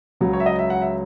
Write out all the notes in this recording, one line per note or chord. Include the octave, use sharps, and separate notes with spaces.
C#2 C#3 F#3
C#5
E5
D#5
E5
F#5
E5